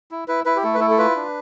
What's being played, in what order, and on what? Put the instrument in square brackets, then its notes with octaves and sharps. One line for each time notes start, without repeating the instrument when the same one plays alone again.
[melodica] E4
E4 B4
E4 B4
G4
A3 A4
B4
E4 A4
A4
F4 B4
D4